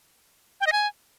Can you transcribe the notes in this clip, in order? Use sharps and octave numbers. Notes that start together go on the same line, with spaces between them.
G5
D#5
G#5